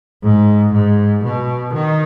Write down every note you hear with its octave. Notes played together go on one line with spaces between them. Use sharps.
G#2
G#2
B2
D#3